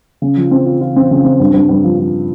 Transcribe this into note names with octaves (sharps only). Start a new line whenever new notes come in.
C#3
F3
C4
F4
F4
C4
C#3
C4
G2
G2
G2
F3
F3